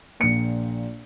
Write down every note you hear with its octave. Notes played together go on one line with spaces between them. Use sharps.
A#1 A#2 C#7